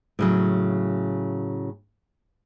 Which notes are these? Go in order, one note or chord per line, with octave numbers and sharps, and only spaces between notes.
A2 C#3 F#3